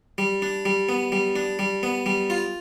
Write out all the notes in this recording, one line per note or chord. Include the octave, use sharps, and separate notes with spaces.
G3
D4
G3
B3
G3
D4
G3
B3
G3
F4